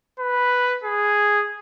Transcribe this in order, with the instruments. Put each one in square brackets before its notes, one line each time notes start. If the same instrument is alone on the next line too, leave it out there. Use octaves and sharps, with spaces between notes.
[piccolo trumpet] B4
G#4